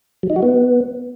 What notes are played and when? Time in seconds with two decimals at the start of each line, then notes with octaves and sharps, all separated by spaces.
0.23 F#3
0.30 D#4
0.36 F#4
0.43 B3